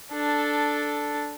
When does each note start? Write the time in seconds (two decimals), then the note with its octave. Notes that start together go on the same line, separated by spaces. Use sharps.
0.12 D4 A4